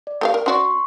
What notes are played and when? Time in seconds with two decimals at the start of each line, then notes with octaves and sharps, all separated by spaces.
0.07 D5
0.21 A3 G4 F5
0.34 A#4
0.46 C#4 F#4 D5 C6 C#6